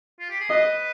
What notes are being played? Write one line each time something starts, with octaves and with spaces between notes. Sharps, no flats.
F4
G4
G#4
B4 D#5